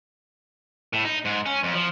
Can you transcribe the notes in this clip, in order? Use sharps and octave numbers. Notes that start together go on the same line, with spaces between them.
A2
D#4
G#2
C#4
F2
F3